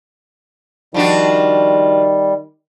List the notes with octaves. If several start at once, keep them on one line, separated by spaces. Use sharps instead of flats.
D#3 F3 G3 D4 F#4